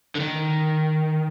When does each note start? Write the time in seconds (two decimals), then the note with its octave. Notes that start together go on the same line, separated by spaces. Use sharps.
0.15 D3
0.20 D#3